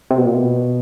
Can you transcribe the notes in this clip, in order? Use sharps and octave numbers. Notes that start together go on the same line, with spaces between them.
C3
B2
A#2
B2